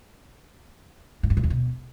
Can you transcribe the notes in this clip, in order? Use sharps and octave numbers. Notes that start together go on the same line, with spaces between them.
A2
G2
A#2
E2
B2